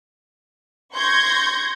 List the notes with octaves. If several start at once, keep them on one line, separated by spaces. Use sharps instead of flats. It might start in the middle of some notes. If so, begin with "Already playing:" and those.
C6 C#6 G6 G#6 A#6